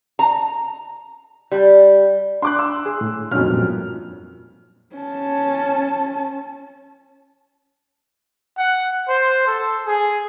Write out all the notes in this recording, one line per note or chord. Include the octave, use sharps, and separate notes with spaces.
A#5
G3
D4 C6 D6 F#6
C6 E6
G#4
A2
F2 A#2 F#3 C#4 D#4 F6
G2 A#2
C#4 A5
F#5
C5
A4
G#4